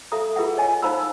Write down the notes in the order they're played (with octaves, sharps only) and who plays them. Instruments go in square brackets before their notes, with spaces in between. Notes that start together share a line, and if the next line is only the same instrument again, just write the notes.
[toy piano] A4 E5 F5 A#5 D#6
F4 G#4 B4 E5 F#5
C#5 D#5 G#5
D#4 C5 F5 A#5 B5 E6